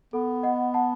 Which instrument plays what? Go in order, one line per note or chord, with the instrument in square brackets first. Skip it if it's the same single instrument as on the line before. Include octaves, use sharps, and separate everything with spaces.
[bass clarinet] B3 [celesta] A4
[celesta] D#5 F#5
F#5 A5